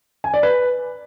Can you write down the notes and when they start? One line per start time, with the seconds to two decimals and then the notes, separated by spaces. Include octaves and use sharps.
0.24 G#5
0.34 D5
0.43 B4